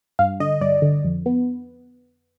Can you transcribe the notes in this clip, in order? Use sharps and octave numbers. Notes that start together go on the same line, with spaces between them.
G2 F5
D3 D#5
G2 D5
D3
F2
B3